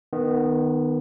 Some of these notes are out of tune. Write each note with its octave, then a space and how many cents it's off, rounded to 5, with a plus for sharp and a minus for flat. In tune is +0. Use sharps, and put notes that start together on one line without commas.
D#3 -20 B3 +0